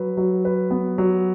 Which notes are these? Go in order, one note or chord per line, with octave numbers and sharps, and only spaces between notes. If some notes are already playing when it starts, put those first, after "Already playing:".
Already playing: F#3 B4
F#3
B4
B3
F#3